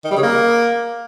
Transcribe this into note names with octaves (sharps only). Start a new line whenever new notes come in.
D#3
G3
C#3
A#3